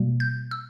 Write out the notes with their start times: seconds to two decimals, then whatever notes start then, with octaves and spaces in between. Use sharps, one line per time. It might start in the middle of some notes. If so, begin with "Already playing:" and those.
Already playing: B2 G3 A#3
0.20 G6
0.51 E6